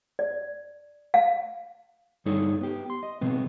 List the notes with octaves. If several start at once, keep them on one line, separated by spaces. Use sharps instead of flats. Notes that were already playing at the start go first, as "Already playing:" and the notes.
D5
F5
G2 G3 D#4 A4 C#5
B3 G4
C6
D#5
B2 F3 B3 C4